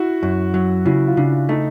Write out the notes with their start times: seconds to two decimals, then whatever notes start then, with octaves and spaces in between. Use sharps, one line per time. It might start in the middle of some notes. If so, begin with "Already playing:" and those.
Already playing: E4 F#4
0.23 F#2
0.54 F#3
0.86 C#3 E4 F#4
1.07 F4
1.17 C#3 D4 E4
1.49 A3 D#4